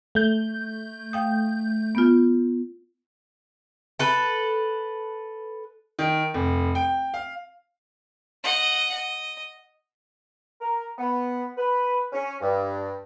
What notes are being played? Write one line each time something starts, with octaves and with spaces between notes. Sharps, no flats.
A3 G6
F5 G5 D#6
B3 F4
A4 B4
D#3
F1
G5
F5
D#5 F#5
D#5
A#4
B3
B4
C#4
G2